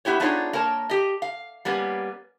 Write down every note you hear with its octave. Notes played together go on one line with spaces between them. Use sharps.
B3 E4 G4 C#5
B3 D4 D#4 F4 G#4 C#5
A#3 A#4 C#5 A5
G4 D#5
F5
G3 A#3 B3 C#4